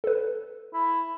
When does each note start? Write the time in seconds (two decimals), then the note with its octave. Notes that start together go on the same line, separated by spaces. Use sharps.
0.04 A4 B4
0.73 E4